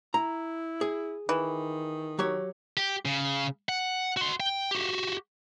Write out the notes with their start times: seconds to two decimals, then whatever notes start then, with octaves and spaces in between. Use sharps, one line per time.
0.14 E4 A#5
0.81 G#4
1.29 D#3 E3
2.19 F#3 G4 C#5
2.77 G4
3.05 C#3
3.69 F#5
4.17 F#4 C6
4.40 G5
4.71 F#4 G4